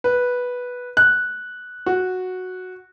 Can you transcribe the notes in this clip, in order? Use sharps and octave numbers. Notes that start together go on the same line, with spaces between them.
B4
F#6
F#4